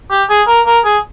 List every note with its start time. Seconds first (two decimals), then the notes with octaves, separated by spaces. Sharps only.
0.11 G4
0.29 G#4
0.48 A#4
0.66 A#4
0.85 G#4